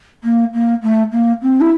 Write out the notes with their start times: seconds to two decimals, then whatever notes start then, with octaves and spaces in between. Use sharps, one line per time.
0.24 A#3
0.54 A#3
0.82 A3
1.12 A#3
1.42 C4
1.60 E4